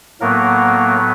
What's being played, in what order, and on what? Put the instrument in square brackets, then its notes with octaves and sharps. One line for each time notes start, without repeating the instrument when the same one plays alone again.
[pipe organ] A2 F#3 A#3 B3 A#4